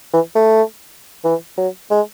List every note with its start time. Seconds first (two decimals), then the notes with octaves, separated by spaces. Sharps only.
0.14 E3
0.35 A3
1.25 E3
1.57 F#3
1.91 G#3